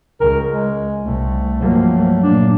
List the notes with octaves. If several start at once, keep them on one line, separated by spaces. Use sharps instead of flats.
C#2 A#4
G#3
C2 A3
G2 F3 F#3 A#3
A#2 A#3 D4